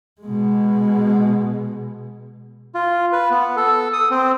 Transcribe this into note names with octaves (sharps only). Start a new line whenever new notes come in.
B2 G#3
F4
B4
B3
A4
D#6
C4